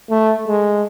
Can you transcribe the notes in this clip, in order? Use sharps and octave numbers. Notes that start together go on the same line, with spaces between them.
A3
G#3